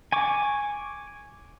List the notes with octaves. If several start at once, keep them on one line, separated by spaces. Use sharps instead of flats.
G#5 C#6 D6